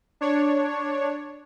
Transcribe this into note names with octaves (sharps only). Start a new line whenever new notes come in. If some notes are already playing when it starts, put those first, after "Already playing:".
D4 C#5